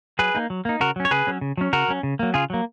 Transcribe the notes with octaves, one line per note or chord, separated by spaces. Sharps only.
F#3 G#4 B4
A#3 D#4
F#3
A#3 D#4
C#3 F#4 A#4
F#3 C#4
C#5
C#3 G#4 B4
F#3 C#4
C#3
F#3 C#4
C#3 F#4 A#4
F#3 C#4
C#3
F#3 A#3
C#3 F4 G#4
F#3 A#3